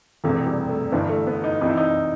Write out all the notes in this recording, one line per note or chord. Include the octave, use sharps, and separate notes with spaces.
E1 E2 C3 A3
G3
A3
G1 G2 E3 B3
A3
B3
D#4
C2 C3 E3 D#4
E4
D#4